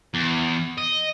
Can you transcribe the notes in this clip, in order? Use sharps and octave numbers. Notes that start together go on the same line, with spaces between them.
E2
D#5